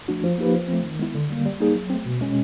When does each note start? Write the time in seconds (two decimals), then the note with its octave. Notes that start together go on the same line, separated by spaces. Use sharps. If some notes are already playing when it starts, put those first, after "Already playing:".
0.08 F3 A3 D4 F#4
0.24 F3
0.38 A#3 D#4 G4 B4
0.54 F3
0.68 A3 C4
0.83 D#3
0.99 G#3 B3 E4
1.14 D3
1.30 G3 A#3
1.45 G3
1.60 A#3 D#4 G#4
1.75 F#3
1.90 A3 C4
2.06 B2
2.21 G#3 C#4